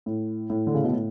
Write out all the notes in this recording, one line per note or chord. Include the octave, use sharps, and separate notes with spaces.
A2
A2
D3
C#3
B2
A2